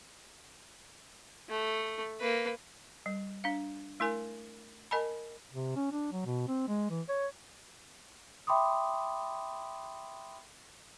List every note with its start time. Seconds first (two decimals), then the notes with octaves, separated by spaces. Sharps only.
1.49 A3
2.20 A#3 B4
3.06 G3
3.44 D4 F5
4.00 A3 E4 A#4 G#5
4.91 A#4 D#5 G#5 A5 B5
5.52 C3
5.76 C#4
5.92 D4
6.12 F#3
6.26 B2
6.48 C4
6.68 G#3
6.90 E3
7.09 C#5
8.47 E5 G5 B5 C6 D6 D#6